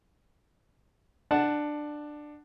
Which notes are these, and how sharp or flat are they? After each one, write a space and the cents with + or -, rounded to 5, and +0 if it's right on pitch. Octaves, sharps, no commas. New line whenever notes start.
D4 +15 F#5 +0 A5 +0